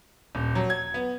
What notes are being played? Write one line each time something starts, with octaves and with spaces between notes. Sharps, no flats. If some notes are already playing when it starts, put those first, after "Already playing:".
D#1
F#3
G#6
B3